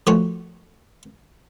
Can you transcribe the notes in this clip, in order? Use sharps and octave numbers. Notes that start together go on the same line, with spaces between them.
F3 A3 F4 F#4 C#5